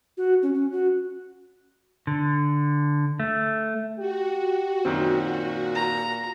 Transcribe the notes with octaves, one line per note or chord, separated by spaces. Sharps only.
F#4
C#4
C#4
F#4
D3
A3
F#4 G4
F#2 A#2 D#3 C4
A#5